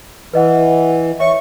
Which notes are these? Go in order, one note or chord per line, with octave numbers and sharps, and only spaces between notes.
E3 B4 D#5 F#5
C#5 E5 C#6